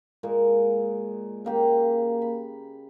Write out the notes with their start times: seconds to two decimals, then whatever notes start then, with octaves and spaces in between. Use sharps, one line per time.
0.23 A#2 G#3 A#3
1.45 C#3 A#3 G4
2.22 B5